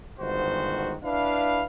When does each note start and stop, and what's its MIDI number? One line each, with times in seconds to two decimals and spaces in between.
0.20 0.96 31
0.20 0.96 44
0.20 0.96 51
0.20 0.96 66
0.20 0.96 72
1.04 1.65 62
1.04 1.65 64
1.04 1.65 71
1.04 1.65 77